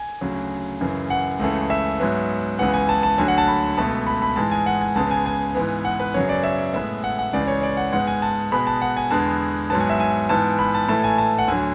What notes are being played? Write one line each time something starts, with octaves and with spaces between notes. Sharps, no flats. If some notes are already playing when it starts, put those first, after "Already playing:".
Already playing: G#5
D2 C#3 F#3
F#2 C#3 E3
F#5
C#2 C#3 E3 A3
E5
G#2 F#3 B3
C#2 C#3 E3 B3 F#5
G#5
A5
A5
D2 D3 F#3 G#5
F#5
A5
B5
C#2 B2 A3 A5
B5
B5
G#2 E3 G#3 A5
G#5
F#5
G#5
C#2 C#3 G#3 B3 A5
G#5
G#5
G#2 E3 B3
F#5
B4
F#2 C#3 F#3 B3 C#5
D5
E5
A2 G#3 B3 E5
F#5
F#5
C#2 C#3 E3 D5
C#5
D5
F#5
G#2 G#3 B3 F#5
G#5
A5
B2 G#3 B3 B5
A5
F#5
G#5
E2 D3 G#3 B3 A5
G#2 F#3 B3 A5
G#5
E5
G#5
G#2 E3 B3 A5
B5
A5
A2 E3 A3 A5
G#5
A5
F#5
D2 D3 F#3 G#5